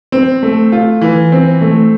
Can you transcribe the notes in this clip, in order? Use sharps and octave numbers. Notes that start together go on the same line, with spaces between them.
C4
A3
F4
E3
C4
A3